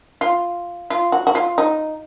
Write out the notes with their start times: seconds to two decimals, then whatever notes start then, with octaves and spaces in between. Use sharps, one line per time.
0.21 F4
0.90 F4
1.12 F#4
1.27 F#4
1.35 F4
1.58 D#4